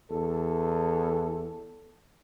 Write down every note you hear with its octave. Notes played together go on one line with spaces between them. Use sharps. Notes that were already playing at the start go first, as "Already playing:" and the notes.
E2 A4